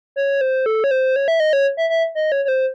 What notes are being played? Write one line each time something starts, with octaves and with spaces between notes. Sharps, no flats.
C#5
C5
A4
C#5
C5
C#5
E5
D#5
C#5
E5
E5
D#5
C#5
C#5
C5